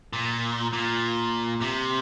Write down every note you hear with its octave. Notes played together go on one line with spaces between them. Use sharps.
A#2
A#2
C3